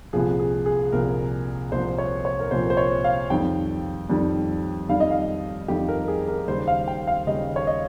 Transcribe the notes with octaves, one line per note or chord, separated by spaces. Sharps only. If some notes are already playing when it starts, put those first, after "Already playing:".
C2 A#2 F3 G#4
G#4
G#4
C2 A#2 F3 A#4
C2 A#2 F3 C5
C#5
C#5
A#4
C2 A#2 F3 C5
C5
C#5
F5
F2 D#3 G3 G5
F2 D#3 G3
F2 D#3 G3 F5
D#5
F5
F2 D#3 G3 G4
A#4
G#4
A#4
D#2 C#3 G3 C5
F5
G5
F5
D#2 C#3 G3 D#5
C#5
D#5